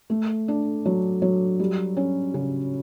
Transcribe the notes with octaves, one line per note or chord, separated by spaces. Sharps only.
A3
D4
F#3
F#3
G3
C#4
C#3